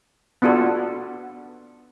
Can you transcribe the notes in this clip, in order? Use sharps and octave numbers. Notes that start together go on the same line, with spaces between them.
B3 D4 F4 F#4 A4